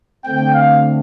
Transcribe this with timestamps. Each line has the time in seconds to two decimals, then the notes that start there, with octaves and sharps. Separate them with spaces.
0.25 D3 A3 C4 G5
0.54 F5